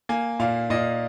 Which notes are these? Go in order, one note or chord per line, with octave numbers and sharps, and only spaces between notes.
A#3 G#5
A#2 F5
A#2 D#5